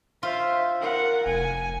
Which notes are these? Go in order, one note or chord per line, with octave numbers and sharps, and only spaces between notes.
F4 C5 E5
A#4 F#5
F1 G#5